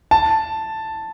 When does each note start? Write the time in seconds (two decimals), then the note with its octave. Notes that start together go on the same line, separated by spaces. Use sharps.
0.11 A5